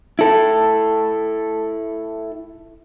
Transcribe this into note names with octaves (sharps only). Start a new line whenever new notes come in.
E4 A4